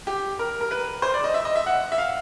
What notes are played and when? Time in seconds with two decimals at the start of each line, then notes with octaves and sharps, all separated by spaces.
0.07 G4
0.39 A#4
0.61 A#4
0.71 B4
1.02 C5
1.14 D5
1.24 D#5
1.34 E5
1.45 D#5
1.56 E5
1.66 F#5
1.92 E5
1.98 F5